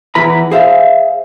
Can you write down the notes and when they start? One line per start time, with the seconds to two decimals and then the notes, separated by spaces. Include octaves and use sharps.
0.15 E2 E3 E4 B4 A#5 B5
0.51 G#4 C5 E5 F5